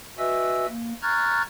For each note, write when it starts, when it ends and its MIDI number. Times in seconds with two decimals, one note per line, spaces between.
0.18 0.66 66
0.18 0.66 71
0.18 0.66 75
0.18 0.66 76
0.18 0.66 80
0.18 0.66 88
0.68 0.93 58
1.03 1.42 82
1.03 1.42 85
1.03 1.42 89
1.03 1.42 90
1.03 1.42 92
1.03 1.42 93